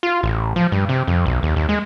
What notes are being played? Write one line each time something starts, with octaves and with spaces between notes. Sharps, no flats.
F4
A1
F3
G2
C3
F2
B1
D#2
D#2
G#3